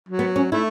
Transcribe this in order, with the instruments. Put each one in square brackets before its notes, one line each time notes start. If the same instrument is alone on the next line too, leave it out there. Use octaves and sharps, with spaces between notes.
[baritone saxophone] F#3
[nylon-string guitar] B3
C#4
[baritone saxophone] A3 [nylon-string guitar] E4